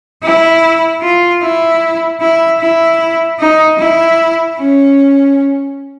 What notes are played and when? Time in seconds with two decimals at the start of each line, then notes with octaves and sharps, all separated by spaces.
0.22 E4
1.01 F4
1.42 E4
2.20 E4
2.60 E4
3.40 D#4
3.78 E4
4.58 C#4